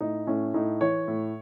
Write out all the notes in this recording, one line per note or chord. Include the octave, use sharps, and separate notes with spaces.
A2 D#4
A2 C#4
A2 D#4
E3 C#5
A2